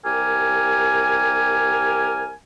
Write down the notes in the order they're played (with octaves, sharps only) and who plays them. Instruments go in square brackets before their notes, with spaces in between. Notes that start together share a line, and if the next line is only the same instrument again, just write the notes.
[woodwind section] C2 G4 A#4 G#5